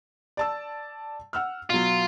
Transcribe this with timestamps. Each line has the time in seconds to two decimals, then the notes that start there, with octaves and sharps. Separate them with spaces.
0.37 D5 A5 E6
1.33 F#5 E6 F6
1.70 B2 F#3 F4